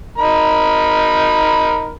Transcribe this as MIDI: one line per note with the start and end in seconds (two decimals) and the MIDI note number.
0.18 1.92 63
0.18 1.92 70
0.18 1.92 83